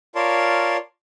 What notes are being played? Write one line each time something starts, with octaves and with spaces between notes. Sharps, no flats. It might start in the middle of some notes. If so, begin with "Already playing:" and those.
F4 A#4 C#5 D5 A5 C6